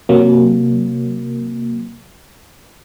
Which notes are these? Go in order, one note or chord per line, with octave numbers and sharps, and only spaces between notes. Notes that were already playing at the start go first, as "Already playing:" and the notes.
C3 F#3 A#3